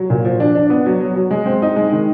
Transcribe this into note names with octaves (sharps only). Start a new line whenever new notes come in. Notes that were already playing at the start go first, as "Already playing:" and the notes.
Already playing: F#3
A#2
F3
D4
D4
B3
F#3
F#3
F#3
G#3
C4
D#4
G#3
D#3